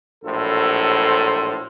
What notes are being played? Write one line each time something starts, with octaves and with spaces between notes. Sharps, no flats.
A#1 A2 F#3 A4 C5